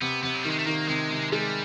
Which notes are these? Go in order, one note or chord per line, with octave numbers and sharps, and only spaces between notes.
C3 B3
C3 B3
F#3
D#3 G3
G#3
A3
D#3 A#3
C3 G#3
C3
G3 G#3